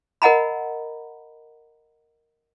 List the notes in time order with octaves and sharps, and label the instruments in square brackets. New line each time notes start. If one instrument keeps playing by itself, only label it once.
[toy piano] A#4 D#5 F#5 G#5 A#5 B5